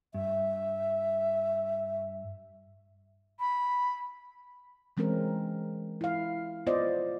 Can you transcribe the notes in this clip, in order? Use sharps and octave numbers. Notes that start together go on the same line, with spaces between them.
G2 E5
B5
E3 G#3 C4 C#4 A#4
E4 F5
B3 F4 C5 D5 D#5